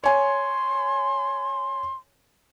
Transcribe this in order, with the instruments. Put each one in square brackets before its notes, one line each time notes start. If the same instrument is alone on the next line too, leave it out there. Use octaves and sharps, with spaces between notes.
[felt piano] C#5 G#5 [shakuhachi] C6